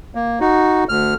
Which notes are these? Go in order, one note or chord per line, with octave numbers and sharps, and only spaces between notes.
A#3
D#4 F#4
D2 F6